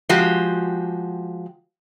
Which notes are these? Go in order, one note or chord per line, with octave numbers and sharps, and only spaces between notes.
F3 G#3 F#4 G4